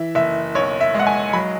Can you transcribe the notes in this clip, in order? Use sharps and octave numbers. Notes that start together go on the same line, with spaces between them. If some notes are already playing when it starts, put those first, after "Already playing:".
Already playing: E3 E5
F#1 E5
B1 C#5
E5
G#3
F#5
G#5
F#3 B5